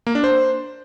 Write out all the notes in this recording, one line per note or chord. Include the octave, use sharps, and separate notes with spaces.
A#3
D4
C5